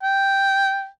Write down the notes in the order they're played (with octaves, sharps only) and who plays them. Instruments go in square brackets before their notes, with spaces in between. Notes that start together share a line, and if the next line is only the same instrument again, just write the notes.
[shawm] G5